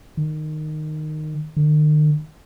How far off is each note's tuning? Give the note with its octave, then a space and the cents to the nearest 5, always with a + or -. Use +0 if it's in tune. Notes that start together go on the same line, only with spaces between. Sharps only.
D#3 -15
D#3 -45